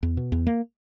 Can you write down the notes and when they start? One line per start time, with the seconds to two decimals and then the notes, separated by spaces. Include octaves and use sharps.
0.03 E2
0.17 B2
0.32 E2
0.47 A#3